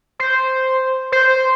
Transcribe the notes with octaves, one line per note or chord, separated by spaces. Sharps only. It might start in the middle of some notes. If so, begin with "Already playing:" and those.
C5
C5